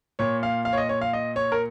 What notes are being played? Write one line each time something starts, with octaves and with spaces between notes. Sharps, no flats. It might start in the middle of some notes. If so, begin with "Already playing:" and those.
A#2 C#5
F5
F5
C#5
D#5
C#5
F5
D#5
C#5
A#4